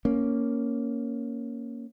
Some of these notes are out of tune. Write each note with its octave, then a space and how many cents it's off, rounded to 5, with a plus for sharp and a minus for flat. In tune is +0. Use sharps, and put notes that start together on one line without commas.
A#3 +0 C#4 +0